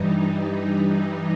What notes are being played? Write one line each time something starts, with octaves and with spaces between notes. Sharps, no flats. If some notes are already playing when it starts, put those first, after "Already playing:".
Already playing: G2 E3 G3 D#4